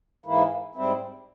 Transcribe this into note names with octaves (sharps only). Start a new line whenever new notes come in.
G#2 E3 A#3 E4
G#2 G3 C4 E4